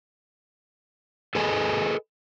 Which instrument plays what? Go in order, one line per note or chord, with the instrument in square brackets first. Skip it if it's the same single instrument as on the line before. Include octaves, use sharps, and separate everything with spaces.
[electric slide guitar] G#4 A4 B4 D#5 G#5